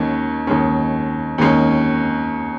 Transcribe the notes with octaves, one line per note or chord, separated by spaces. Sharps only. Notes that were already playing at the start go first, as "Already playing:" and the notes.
Already playing: D#2 D#3 G#3 C#4
D#2 D#3 G#3 C#4
D#2 D#3 G#3 C#4